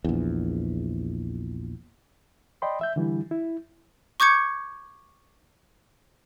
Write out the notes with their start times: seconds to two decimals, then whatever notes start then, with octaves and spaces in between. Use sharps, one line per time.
0.04 A#1 E2
2.62 D5 D#5 G5 B5 C6
2.81 E5 G6
2.96 D3 E3 G3 E4
3.31 E4
4.20 C#6 D6 G6 G#6 C#7